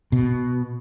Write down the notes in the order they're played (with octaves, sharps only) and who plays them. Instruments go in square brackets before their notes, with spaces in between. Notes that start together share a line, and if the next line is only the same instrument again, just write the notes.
[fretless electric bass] B2